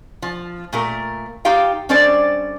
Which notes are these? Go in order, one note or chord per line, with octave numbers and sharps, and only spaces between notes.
F3
A#2 A3 A#4
D#4 F4 G4 F5 G5
G3 C#4 D4 A4 C5 D5